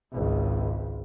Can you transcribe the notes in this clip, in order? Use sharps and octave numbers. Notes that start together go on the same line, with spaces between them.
G#1 C#2